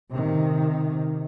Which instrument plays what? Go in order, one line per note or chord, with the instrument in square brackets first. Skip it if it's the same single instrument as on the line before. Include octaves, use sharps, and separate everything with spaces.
[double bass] C3 D#3